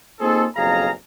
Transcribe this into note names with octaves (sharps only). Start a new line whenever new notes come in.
A#3 C4 D#4 F4 G#4 A4
F#1 B1 F2 G#4 F5 A#5